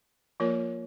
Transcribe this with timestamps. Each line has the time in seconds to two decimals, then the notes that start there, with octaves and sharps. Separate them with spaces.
0.40 F3 A#3 F4 A#4 C#5